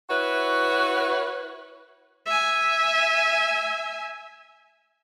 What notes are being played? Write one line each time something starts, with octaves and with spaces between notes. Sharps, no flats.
E4 F#4 B4 C#5
E5 G#5